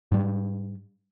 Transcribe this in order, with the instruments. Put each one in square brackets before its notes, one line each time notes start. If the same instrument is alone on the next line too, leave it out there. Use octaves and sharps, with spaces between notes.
[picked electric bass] G#2 G3